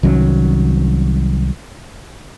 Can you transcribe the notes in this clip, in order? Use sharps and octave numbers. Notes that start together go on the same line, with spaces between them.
C2 D#3 F#3 C#4